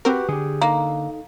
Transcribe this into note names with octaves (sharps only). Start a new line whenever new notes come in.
C4 F#4 G4 A#4 B4
D3 G4 G#4
A#3 D#4 A4